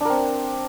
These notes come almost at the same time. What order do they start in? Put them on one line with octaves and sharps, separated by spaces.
D4 A#4 C4